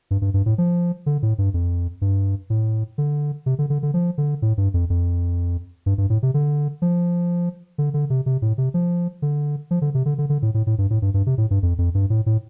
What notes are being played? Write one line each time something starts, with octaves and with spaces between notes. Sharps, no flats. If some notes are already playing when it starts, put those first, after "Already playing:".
G2
G2
G2
A2
F3
D3
A2
G2
F2
G2
A2
D3
C3
D3
D3
D3
F3
D3
A2
G2
F2
F2
G2
G2
A2
C3
D3
F3
D3
D3
C3
C3
A2
C3
F3
D3
F3
D3
C3
D3
D3
D3
A2
A2
A2
G2
A2
G2
G2
C3
A2
G2
F2
F2
G2
A2
A2